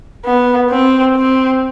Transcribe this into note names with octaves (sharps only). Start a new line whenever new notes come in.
B3
C4
C4